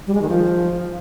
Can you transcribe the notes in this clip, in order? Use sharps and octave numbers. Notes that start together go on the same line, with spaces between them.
G3
G#3
D#3
F3